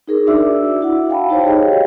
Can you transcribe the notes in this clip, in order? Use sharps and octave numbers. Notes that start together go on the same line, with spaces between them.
D#4 G#4 A#4
D4 F#4 D5 E5 D6 E6
E4 F#4 F#5
F5 G5 A5 B5
D#4 F#4 C5 C#5
G4 G#4 C#5 D#5 F5 G5